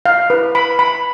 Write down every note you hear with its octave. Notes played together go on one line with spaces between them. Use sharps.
F5
B4
B5
B5